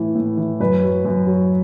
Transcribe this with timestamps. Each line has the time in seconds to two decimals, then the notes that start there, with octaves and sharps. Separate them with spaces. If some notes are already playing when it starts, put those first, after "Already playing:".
Already playing: A2 E3
0.16 A2
0.37 E3
0.60 F#2 B4
0.83 F#3
1.05 F#2
1.27 F#3